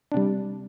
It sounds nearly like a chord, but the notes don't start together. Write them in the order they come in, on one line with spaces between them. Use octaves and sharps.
D4 C3 G3